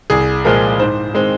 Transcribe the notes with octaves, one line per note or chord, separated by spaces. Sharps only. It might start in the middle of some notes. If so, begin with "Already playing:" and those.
C2 G#4
A#2 F3 G#3 A#4
G#2 C5
D#3 G#3 C4